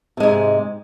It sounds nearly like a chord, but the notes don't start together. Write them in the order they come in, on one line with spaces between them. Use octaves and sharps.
C3 G#3 G#2